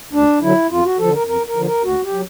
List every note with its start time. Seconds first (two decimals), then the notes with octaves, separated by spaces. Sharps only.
0.13 D2 D4
0.41 D3 F#3 E4
0.70 F2 F4
0.85 F#4
0.99 D3 F3 A4
1.14 A#4
1.27 F2 A#4
1.47 A#4
1.56 D3 F3
1.65 A#4
1.84 D2 F#4
2.04 G4
2.13 F#3